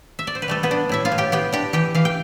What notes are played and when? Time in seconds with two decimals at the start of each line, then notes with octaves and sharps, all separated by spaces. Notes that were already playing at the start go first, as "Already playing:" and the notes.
0.19 E5
0.27 D5
0.35 C5
0.42 B4
0.48 G3 A3 A4
0.63 B3 B4
0.71 D4
0.89 A2 E4 E5
1.05 F4 F5
1.12 A2
1.18 G4 G5
1.32 B3 G4 G5
1.52 D4 G4 G5
1.73 E3 G4 G5
1.95 E3 F5
2.05 G5